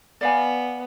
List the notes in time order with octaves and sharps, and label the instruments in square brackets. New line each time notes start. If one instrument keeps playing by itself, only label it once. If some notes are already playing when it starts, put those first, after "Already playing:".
[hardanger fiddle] B3 [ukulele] D5 F5 G#5